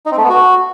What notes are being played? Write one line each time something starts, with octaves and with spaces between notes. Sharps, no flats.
D#4
C4
A3
B3
F#4